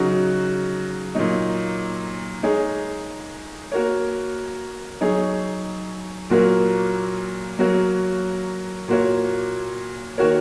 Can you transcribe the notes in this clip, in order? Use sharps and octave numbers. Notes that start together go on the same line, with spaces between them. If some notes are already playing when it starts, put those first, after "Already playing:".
Already playing: C#3 F#3 D#4 F#4
A#2 F#3 D#4
G#3 D#4 G#4 C#5
A#3 F#4 A#4 C#5
F#3 D#4 G#4 C#5
A#2 F#3 A#3 F#4 A#4
F#3 A#3 F#4 A#4 C#5
A#2 A#3 F#4 C#5
D#3 A#3 F#4 A#4 C#5